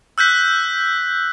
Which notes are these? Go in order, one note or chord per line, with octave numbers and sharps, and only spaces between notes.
E6 F#6 G6 B6